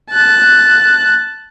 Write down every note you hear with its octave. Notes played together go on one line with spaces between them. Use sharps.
A5 F#6